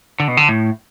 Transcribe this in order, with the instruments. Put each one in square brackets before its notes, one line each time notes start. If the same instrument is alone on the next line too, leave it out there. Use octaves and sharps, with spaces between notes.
[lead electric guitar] D3
B2
D3
A2